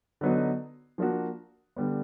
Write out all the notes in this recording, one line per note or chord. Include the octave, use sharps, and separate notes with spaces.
D3 F#3 B3 D#4
F3 A#3 D4 F#4
D3 G3 B3